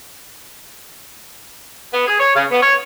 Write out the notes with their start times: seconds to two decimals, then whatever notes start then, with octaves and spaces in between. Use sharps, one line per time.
1.93 B3
2.07 G#4
2.20 C#5
2.35 C#3
2.51 B3
2.62 C#5